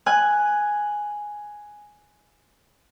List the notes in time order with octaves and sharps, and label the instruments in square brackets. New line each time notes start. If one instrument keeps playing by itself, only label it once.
[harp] G#5 F#6